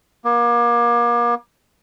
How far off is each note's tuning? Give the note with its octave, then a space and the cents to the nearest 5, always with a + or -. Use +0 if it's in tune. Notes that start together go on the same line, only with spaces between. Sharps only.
A#3 +35